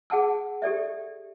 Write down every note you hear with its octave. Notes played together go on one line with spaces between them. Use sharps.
G#4 F#5 A5 E6
G4 A4 D5 E5